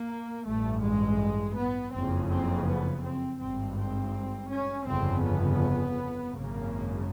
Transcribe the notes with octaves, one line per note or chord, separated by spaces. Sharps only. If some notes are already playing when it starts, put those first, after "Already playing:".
Already playing: A#3
A1 G2 A3
G#3
B3
F#1 F2 C#3 C4
C4
B3
C4
G#1 G2 C4
C4
C#4
G1 F2 C#3 C4
B3
G#1 F#2 C#3 A#3